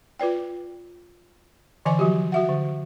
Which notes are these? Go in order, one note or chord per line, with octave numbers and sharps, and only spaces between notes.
F4 B4 D5 G5
D3 E3 D#5 G#5 C6
F3 F#3 F#4 G4
F#4 E5 F#5
D3